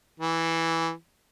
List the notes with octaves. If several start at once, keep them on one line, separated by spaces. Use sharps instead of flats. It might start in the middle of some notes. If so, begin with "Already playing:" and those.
E3